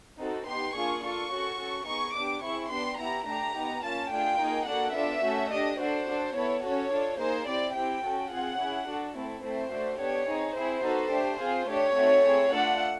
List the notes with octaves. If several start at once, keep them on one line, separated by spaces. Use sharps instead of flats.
C4 D#4 F#4 A4
B3 D#4 G4 C6
A#3 D4 F4 G#4 C#6
D4 F4 A4 C#6
C#4 F#4 A4
C#4 F#4 A4
B3 D#4 G#4 C#6
B3 D4 G4 D6
C4 E4 G#4 C#6
B3 D4 G4 C6
B3 E4 G4 A#5
A3 D4 G4 A#5
B3 D#4 G4
A#3 C#4 F4 A5
A3 D4 F4 G#4 G5
A#3 D#4 G#4
A#3 D4 F#4 A4 F#5
B3 D4 F4 A4 E5
A3 C#4 F#4 A4
D4 G4 D#5
D4 F#4 A4 C5
D4 F#4 A4
B3 E4 A4 C#5
C#4 F#4 A4 C#5
D4 F4 A4
A#3 D#4 G#4 C5
C4 E4 G4 D5
C4 E4 G4 G5
C#4 F#4 A4
C4 F4 G#4 F#5
C#4 E4 G#4
D4 F#4 A4
A3 C4 E4 A4
A3 C4 E4 C5
A3 D4 F#4 A4
B3 D4 G4 C#5
C4 D#4 G#4
C4 E4 G#4 C5
B3 D#4 F#4 A4
A3 D4 G4
C4 F4 G#4
A3 D4 G4 C#5
A3 C4 D#4 F#4
C4 E4 G#4
A3 D4 F4 A4 F#5